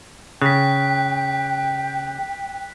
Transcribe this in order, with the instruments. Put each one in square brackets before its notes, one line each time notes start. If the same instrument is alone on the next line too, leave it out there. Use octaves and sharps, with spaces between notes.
[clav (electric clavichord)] C#3 [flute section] G5 [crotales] F#6 B6